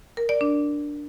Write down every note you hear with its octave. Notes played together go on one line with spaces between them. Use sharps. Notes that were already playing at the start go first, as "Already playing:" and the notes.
A#4
D5
D4